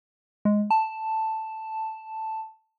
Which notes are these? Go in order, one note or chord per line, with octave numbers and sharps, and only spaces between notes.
G#3
A5